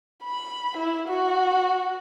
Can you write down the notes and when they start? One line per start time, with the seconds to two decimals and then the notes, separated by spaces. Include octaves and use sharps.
0.24 B5
0.77 E4
1.08 F#4